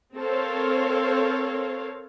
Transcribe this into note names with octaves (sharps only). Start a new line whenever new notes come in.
C4 A4 A#4 C5 C#5 F5